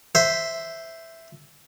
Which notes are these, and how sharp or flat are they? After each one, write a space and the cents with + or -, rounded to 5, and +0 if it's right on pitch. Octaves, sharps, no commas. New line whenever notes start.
C5 -5 E5 +0